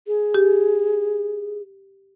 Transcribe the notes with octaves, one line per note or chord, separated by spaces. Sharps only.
G#4
G4